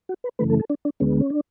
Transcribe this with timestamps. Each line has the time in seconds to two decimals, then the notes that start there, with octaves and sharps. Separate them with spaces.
0.09 F#4
0.24 B4
0.39 F#2 C#3 E3 A3 B4
0.50 A4
0.60 A4
0.70 D4
0.85 D4
1.00 D2 D3 G#3 B3 C#4
1.20 C#4
1.30 D4